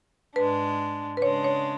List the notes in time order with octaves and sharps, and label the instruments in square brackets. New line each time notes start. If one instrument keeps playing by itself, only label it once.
[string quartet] G#2 G#3 D4 [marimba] B4
[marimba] B4
[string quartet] C#3 G#3 D4 [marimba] C#5
[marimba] C#5